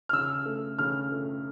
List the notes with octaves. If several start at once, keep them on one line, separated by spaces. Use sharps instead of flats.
F6
C#3 E6
A3
C#3 F6
A3